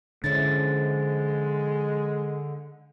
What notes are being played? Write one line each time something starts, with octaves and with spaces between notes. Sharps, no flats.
D3 F3 G#3 C#4 E4 A6